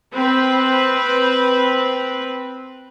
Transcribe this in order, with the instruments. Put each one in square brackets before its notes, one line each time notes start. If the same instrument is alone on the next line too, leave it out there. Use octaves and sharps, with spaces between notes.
[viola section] C4 B4